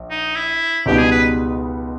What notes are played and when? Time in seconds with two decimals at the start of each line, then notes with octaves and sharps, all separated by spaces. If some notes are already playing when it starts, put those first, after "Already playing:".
Already playing: A#1
0.10 D#4
0.35 E4
0.86 C#2 B2 G3 B3 D#4 G4
0.98 G#4
1.11 B4